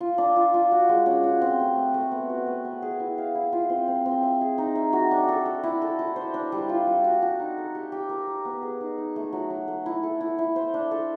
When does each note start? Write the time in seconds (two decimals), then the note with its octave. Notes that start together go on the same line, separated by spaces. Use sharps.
0.01 F4
0.18 D4
0.36 F4
0.54 F4
0.72 F#4
0.89 G#3
1.06 C#4
1.23 F#4
1.41 C4
1.60 A3
1.76 C4
1.94 A3
2.11 B3
2.30 F#4
2.47 B3
2.65 B3
2.82 G#4
3.00 E4
3.18 F5
3.35 E4
3.53 F4
3.70 C4
3.88 C4
4.06 C4
4.23 E5
4.41 G#4
4.58 D#4
4.75 E5
4.93 F#4
5.11 D4
5.28 A4
5.46 A4
5.63 E4
5.82 A4
5.99 E4
6.16 C5
6.34 D4
6.52 G3
6.69 F4
6.87 G3
7.04 F#4
7.22 F#4
7.39 D#4
7.58 A4
7.75 G4
7.92 G4
8.09 A#4
8.27 A#4
8.45 B3
8.62 G#4
8.80 D#4
8.98 D#4
9.16 A3
9.33 F#3
9.50 F#3
9.68 A3
9.86 E4
10.03 A4
10.21 E4
10.39 E4
10.56 C5
10.74 D4
10.91 A4